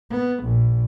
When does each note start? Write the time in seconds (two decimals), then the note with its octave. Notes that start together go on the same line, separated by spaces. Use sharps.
0.10 B3
0.44 A#1